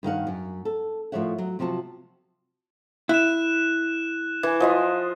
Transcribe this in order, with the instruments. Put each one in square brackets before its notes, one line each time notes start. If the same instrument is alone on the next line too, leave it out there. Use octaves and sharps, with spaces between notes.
[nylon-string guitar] G2 D#3 F5 F#5
F#2
A4
A2 F3 A#4 C#5 E5 F#5
F#3
C3 F3 F#3 F#4 A5
[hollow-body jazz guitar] E4 [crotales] F#6 E7
[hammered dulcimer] E3
F3 D#5 C6